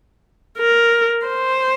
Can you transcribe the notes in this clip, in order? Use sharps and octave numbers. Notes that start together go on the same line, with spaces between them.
A#4
C5